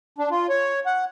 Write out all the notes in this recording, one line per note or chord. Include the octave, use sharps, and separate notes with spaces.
D4
F4
C#5
F#5